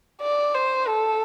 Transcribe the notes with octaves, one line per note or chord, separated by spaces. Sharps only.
D5
C5
A4